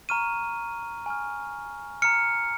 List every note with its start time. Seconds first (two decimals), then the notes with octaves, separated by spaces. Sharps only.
0.09 A#5 C#6 F6 D#7
1.06 G#5 C#6 F6
2.02 A#5 F6 C#7